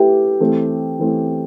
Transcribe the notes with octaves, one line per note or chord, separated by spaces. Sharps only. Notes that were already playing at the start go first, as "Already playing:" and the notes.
Already playing: A3 E4 G4 B4 E5
E3 A3 C4
E3 A3 C4